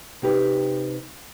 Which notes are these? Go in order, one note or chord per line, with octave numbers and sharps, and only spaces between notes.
C3 D#4 G4 B4